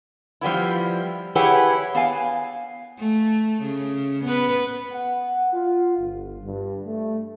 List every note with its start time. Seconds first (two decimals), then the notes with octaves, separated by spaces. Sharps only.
0.41 F3 G3 B3 E4
1.35 E4 G4 G#4 B4 C#5 F#5
1.95 B3 F5 G#5
2.99 A3
3.62 C#3
4.24 B3 B4
4.92 F#5
5.52 F4
5.98 G1
6.44 G2
6.85 A3